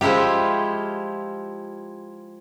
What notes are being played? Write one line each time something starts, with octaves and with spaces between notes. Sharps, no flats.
F3 G#3 E4 F4 G4